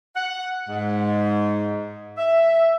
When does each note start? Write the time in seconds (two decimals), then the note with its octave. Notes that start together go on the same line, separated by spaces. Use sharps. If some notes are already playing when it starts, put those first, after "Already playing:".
0.16 F#5
0.69 G#2
2.18 E5